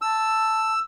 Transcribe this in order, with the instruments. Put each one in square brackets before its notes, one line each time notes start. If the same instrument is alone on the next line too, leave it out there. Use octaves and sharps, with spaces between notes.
[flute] A5 [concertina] E6